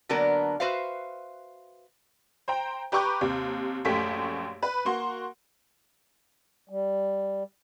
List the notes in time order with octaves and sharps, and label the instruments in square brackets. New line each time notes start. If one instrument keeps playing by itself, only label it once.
[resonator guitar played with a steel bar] D3 F#3 A#3 B3 D4 A#4
F#4 B4 C5 E5 F5
[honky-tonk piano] C5 G5 A#5
G4 B4 A#5 C#6 D6 G6
D#2 C3
A#1 F#2 A3 G4 B6
B4
A#3 F#4 C6
[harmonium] G3